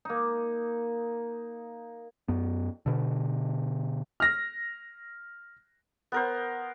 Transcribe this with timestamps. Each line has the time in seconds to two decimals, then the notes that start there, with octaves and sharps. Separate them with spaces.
0.05 A#3 D#4
2.28 F#2 B3
2.86 B2 D3
4.20 F6 A#6
6.12 B3 A#4 C5